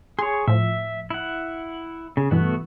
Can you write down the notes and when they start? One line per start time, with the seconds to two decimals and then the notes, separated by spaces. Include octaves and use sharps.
0.19 G#4 C#5 C6
0.48 A2 F3 E5
1.10 E4 F#5
2.17 C#3
2.31 G2 B2 E3 A3 B3 F#4